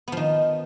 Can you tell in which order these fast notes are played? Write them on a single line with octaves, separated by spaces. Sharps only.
B3 F3 D#3